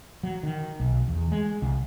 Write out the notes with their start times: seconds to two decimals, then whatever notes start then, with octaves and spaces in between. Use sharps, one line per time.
0.23 F#3
0.43 D#3
0.80 B1
1.08 E2
1.32 G#3
1.62 C2